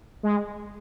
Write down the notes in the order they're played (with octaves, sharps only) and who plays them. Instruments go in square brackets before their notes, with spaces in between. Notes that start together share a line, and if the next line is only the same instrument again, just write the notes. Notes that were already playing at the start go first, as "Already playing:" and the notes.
[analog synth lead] G#3